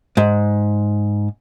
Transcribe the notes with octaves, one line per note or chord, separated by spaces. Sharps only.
G#2